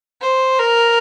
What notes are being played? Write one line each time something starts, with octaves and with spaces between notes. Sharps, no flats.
C5
A#4